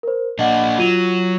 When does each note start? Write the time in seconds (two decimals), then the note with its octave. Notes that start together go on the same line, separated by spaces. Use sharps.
0.03 A#4 C5
0.39 A#2 D4 D#5 F#5
0.79 F#3 F4 D#7